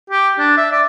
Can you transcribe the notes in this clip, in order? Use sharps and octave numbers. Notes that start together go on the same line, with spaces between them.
G4
D4
E5
D5